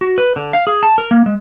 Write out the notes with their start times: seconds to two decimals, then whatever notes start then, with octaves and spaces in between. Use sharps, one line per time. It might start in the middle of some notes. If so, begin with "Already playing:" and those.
0.01 F#4
0.18 B4
0.36 D3
0.53 F5
0.67 G#4
0.83 A5
0.98 A#4
1.11 A#3
1.26 G#3